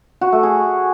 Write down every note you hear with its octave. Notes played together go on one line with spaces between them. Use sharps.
F#4
A3
G#4